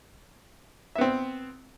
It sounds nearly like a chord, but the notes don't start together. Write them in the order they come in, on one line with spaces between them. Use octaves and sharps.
E5 B3 C4